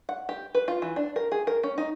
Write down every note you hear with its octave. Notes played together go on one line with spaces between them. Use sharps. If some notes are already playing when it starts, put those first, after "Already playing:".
F#5
G4
B4
F4
E3
D4
A#4
G#4
A#4
C#4
D#4